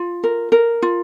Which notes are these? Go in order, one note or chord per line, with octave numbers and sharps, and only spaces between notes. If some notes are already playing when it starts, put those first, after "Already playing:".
Already playing: F4
A#4
A#4
F4